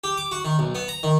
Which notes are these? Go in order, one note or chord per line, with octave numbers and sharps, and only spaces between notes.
G4
D6
F#4
D#3
B1
B3
A#5
D#3